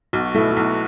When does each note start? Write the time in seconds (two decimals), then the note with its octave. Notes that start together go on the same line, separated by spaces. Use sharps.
0.13 B1 F#4
0.35 B2 A3 E4
0.51 F#4
0.57 B1 E4